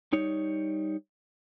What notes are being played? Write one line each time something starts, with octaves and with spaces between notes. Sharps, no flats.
G3 D#4 C#5